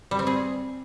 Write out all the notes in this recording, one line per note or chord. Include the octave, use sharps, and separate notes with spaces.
G3
C4
G#4